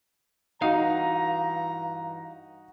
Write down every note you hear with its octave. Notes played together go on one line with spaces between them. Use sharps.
G2 E3 D#4 F#4 D#5 F5 A#5